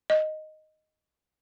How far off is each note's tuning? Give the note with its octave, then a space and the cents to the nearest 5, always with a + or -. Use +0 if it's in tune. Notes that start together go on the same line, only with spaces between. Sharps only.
D#5 +0